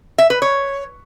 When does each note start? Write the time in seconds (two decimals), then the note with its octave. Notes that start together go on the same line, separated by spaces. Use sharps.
0.18 E5
0.30 B4
0.42 C#5